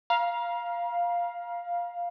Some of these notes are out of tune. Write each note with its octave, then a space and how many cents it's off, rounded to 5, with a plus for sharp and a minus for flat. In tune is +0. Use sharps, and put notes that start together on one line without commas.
F5 +0 A#5 +40